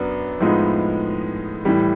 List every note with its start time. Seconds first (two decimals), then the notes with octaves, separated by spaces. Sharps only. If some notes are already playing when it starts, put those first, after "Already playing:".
Already playing: F#2 F#3 B3 D4
0.40 A2 F3 G#3 B3 D#4
1.65 A2 E3 G3